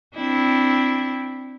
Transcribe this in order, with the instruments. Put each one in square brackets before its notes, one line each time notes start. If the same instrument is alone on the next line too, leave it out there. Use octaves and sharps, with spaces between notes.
[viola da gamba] C4 D4 E4